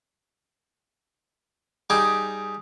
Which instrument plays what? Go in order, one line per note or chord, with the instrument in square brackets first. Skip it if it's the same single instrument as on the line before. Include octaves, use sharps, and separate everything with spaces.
[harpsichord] G3 D#4 G4 G#4